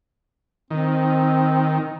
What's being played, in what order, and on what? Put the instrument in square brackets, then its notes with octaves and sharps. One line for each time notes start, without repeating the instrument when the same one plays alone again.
[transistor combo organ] D#3 [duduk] C4